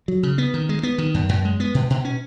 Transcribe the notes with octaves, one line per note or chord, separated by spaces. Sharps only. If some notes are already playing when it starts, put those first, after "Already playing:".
F#3
C#3
B3
D#3
G#3
B3
D#3
F#2
F#2
G#3
B3
B2
B2
C#4